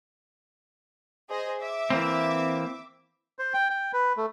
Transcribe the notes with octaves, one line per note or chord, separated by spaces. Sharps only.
G#4 C5 D#5
E5 D6
E3 A#3 C4
C5
G5
G5
B4
A3